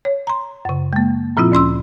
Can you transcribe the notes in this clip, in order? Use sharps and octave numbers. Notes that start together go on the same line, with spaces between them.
C#5
A#5 C6
F#2 C#3
G#3 A#3
A#2 F3 C4 E4 F4
D2 C#4 C6 E6